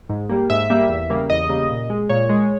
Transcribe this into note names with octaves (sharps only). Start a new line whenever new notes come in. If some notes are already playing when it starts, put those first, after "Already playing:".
G#2
G3 A#3
G#2 E5
G3 A#3
E2
C#3 G3 A#3
E2 D#5
C#3 G3 A#3
A#2
G#3
A#2 C#5
G#3